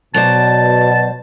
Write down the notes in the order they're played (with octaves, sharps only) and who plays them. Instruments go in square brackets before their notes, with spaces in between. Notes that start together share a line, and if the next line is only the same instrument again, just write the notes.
[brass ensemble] B2 [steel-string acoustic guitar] F#3 C5 D5 [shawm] A5